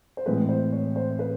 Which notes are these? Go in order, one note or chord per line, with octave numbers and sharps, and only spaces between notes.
C5
A2 E3 G#3 C4 B4
C5
C#5
C5
B4